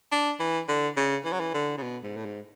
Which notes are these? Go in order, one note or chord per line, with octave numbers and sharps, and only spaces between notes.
D4
E3
D3
C#3
E3
F#3
E3
D3
C#3
B2
G#2
A2
G#2